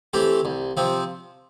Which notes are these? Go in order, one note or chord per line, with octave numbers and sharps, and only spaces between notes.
E3 A3 C4 G4
C2
C3 F3 C4